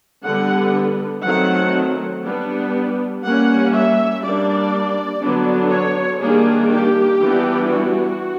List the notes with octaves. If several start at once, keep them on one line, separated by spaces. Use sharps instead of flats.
D3 G3 B3 F#5
D#3 F#3 A3 C4 F#5
G3 B3 D4
G3 A#3 C#4 F#5
E5
G3 A#3 D4 D5
D3 F#3 B3 D4
C#5
D#3 G3 A#3 D4 G#4
G4
E3 G3 B3 D4
F#4